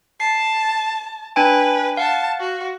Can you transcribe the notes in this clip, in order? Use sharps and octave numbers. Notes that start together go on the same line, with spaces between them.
A5 C7
D4 B4 G5 G#5
F5 F#5 A5
F#4